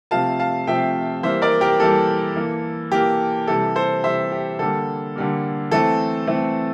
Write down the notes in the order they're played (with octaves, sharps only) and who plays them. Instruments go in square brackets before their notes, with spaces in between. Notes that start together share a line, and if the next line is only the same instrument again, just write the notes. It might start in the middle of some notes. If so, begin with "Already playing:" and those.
[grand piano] C3 F3 A3 C4 F5 A5
F5 A5
C3 F3 A3 C4 E5 G5
E3 G3 A#3 C5 E5
A#4 D5
G4 A#4
E3 G3 A#3 A4
E3 A#3
E3 A#3 G4
C3 E3 G3 A4
A4 C5
C3 E3 G3 C5 E5
G4
D3 G3 A#3 A4
D3 G3 A#3
E3 A3 C4 A4
E3 A3 C4